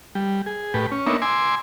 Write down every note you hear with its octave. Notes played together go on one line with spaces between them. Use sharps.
G3
G#4
A2 G4 B4
C#4
A#3 B3 D4 D#4 C#5 E5
G#5 C6 D6 E6